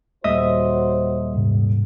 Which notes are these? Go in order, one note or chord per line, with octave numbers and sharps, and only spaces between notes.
D#1 F#3 F#4 C5 D#5 E5 D#6
G#2 C3